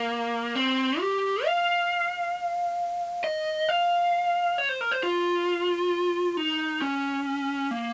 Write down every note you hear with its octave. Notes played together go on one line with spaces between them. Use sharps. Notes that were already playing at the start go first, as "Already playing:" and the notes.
Already playing: A#3
C4
G4
F5
D#5
F5
C#5
C5
A#4
C5
F4
D#4
C#4
A#3